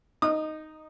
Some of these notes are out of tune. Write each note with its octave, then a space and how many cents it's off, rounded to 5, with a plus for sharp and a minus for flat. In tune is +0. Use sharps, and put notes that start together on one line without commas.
D#4 +0 D#6 -30